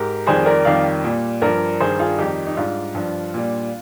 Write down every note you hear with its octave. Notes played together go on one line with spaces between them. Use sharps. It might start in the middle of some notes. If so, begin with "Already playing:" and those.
Already playing: G#2 G4 A#4
F2 D#3 G3 G#4 C5
A#4 D5
F2 D#3 G3 D5 F5
A#2 G3
G2 F3 A#4 D5
G2 D#3 G3 G#4 C5
F4 G#4
F2 D#3 G3 D#4 G4
D#4
G#2 G3 D4 F4
G2 F3
A#2 G3